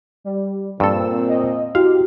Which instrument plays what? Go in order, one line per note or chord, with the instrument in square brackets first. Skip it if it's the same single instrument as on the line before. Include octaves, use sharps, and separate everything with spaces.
[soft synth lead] G3
[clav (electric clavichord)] G2 A4 [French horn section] A#2 C4 [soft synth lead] E6
[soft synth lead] D#5
[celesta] E4 F#4 [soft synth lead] G4 [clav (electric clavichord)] F5